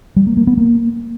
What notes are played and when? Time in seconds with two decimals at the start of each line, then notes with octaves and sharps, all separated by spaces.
0.16 G3
0.27 A#3
0.37 A#3
0.47 B3
0.58 A#3